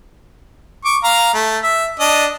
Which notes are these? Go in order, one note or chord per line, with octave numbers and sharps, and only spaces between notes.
C#6 D6
F5 A#5
A3
E5
D4 D#5